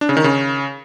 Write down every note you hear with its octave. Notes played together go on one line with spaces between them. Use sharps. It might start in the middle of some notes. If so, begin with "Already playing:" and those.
D4
C#3
D#3
C#3